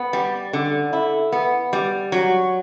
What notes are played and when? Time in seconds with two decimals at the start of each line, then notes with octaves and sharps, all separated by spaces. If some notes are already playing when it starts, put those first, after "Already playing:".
Already playing: B3
0.13 G3
0.53 D3
0.93 E4
1.32 B3
1.73 G3
2.12 F#3